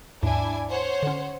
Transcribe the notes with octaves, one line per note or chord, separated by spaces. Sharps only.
D#2 G#2 D4 E4 G#5
C5 C#5 F#5
D3 C#4